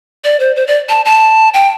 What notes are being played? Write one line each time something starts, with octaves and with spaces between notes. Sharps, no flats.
D5
C5
C5
D5
A5
A5
G5